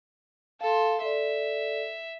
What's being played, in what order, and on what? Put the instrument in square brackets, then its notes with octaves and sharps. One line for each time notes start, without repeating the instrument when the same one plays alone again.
[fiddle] A4 C6 [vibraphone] F5
[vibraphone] A4 D5 [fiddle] E5